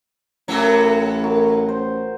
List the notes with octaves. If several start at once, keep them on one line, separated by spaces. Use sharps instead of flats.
A1 A2 E3 F#3 A#4 A#5
F#4 A#4
C5